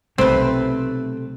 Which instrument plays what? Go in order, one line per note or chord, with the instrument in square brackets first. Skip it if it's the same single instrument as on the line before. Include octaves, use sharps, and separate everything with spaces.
[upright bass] B1 [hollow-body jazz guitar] C3 A3 [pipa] C4 B4